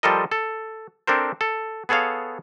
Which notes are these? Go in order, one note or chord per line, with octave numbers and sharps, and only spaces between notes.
F3 G3 F4 A4 A#4 D#5
A4
C4 D4 A4 A#4 C5
A4
B3 G#4 A4 C#5 F5